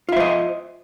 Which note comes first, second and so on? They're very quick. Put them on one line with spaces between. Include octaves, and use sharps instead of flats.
F4 E5 C5 D#5